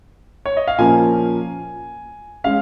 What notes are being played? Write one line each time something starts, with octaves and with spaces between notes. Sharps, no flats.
C#5
D#5
F5
A#2 F3 A#3 C#4 G#5
G#3 C#4 F5